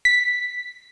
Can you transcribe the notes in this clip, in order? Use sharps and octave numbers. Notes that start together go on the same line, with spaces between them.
B6